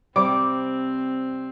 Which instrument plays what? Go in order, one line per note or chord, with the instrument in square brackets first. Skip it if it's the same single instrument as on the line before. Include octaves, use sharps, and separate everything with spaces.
[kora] C3 G3 [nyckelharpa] C4 [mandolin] D6